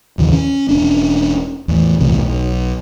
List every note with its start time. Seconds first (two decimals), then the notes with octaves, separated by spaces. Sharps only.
0.18 A1 D#2 C#3 E3
0.32 C#4
0.69 E1 C#4 D4
1.68 E2 A2
2.00 B1 E2 A2 C3
2.15 B1